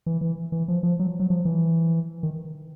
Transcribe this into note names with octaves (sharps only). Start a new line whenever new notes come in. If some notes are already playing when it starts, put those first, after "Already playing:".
E3
E3
E3
F3
F3
F#3
F#3
F3
E3
D#3